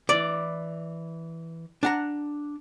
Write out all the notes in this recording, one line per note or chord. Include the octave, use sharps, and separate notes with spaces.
E3 D5
D4 F#5 A#5